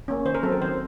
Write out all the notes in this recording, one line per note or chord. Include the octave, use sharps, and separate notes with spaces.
A#3 C#4
D#3 C5
A#4
F#3 C4 A4
A#4
D#3 C5